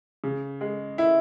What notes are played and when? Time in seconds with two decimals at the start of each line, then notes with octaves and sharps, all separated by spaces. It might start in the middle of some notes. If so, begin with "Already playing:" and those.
0.24 C#3
0.61 G#3
0.98 E4